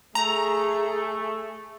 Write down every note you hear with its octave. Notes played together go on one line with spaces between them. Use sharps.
A3 G#4 A#5